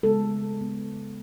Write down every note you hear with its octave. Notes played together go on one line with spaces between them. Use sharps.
C#3 G#3 B3 A4
C#3 G#3 B3